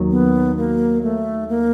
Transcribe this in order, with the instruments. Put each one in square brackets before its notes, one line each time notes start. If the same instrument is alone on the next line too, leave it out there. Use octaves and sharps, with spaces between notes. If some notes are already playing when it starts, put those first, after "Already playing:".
Already playing: [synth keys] D#2 D#3 F#3
[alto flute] B3
A#3
A3
A#3